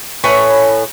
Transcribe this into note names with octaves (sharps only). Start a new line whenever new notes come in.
A2 B4 C#5 G#5